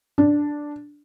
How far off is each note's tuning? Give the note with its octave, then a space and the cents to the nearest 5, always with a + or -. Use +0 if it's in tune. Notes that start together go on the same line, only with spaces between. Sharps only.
D4 +0